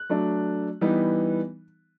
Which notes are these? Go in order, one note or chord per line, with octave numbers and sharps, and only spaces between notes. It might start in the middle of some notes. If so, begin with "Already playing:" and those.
Already playing: F#6
F#3 A3 D4
E3 G3 B3 D#4